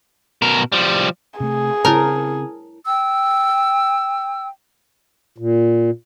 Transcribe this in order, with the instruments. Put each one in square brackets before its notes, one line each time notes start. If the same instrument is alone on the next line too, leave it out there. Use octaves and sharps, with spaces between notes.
[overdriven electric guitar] B2 A#4
F3 G3
[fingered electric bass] C3 A3 [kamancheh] G#4
[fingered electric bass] C#3 C4 [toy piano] E4 C#5 A5 [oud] A#4
[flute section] G5 E6
[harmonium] A#2